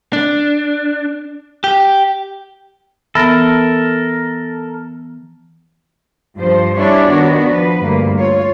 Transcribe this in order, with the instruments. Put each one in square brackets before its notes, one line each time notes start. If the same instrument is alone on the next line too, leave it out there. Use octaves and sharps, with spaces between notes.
[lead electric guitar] D4
G4
[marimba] E3 B3 [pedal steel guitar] A4 A#4
[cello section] G2 F3 C5
G3 C#4 D4 E4 C#5 D5
D#3 B3 D4 F#4
F3 B4
D2 G2 A#3
F4 C#5